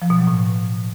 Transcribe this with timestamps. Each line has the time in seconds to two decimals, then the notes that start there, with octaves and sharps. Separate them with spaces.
0.02 F3
0.10 B2
0.19 F#3
0.27 A2